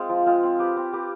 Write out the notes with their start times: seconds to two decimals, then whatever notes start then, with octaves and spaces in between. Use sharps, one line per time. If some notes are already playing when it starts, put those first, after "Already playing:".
Already playing: G#3 C4 F4
0.09 F3
0.26 G#3 C4 F4
0.43 C4
0.59 G4 B4
0.77 C4
0.93 G4 B4